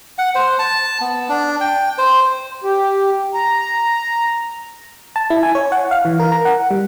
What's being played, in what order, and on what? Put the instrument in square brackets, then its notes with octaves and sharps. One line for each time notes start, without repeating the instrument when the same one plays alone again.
[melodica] F#5
C5
A5
B3
D4
G5
C5
[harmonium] G4
A#5
[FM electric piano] A5
E4
G#5
C#5
F#5
F5
E3
A#4
A#5
F#5
G3